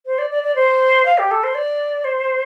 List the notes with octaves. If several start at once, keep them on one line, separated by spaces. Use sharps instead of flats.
C5
D5
D5
D5
C5
F5
G4
A4
C5
D5
C5